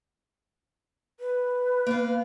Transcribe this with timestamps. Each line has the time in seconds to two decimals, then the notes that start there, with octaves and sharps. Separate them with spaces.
1.20 B4
1.87 A#3 B3 F5